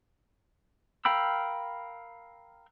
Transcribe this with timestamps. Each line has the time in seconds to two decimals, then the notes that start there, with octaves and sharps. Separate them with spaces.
1.05 A#4 F5 G5 B5 E6